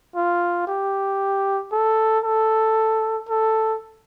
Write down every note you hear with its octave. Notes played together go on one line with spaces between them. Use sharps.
F4
G4
A4
A4
A4